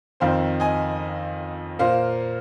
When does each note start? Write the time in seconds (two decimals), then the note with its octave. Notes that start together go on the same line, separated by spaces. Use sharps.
0.20 F2 D#3 C4 C5 F5
0.60 D#5 G#5
1.79 A#2 A#3 C5 F5